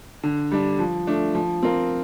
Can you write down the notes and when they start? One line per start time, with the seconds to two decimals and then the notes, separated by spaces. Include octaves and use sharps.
0.23 D3
0.51 G3 D4
0.79 F3
1.07 A3 D4
1.35 F3
1.63 C4 F4 A#4